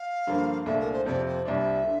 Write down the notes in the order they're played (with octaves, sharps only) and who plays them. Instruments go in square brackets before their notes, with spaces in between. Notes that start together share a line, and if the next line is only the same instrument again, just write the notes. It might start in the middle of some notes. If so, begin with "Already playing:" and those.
Already playing: [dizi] F5
[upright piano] G2 D3 F3 A#3
[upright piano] C2 A#2 A3 D4 [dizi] E5
[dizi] A#4
C5
[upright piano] F2 C3 F3 [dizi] D5
[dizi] C5
[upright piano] C2 C3 G3 D4 [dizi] E5
[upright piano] D3